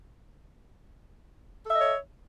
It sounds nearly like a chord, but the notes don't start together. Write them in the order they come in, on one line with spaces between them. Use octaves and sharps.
A4 E5 D#5 C#5